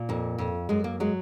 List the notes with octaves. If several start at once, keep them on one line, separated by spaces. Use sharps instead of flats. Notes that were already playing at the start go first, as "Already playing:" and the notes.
Already playing: A#2
F2 A#3
F2
F#2 G#3
A#3
F#3 G#3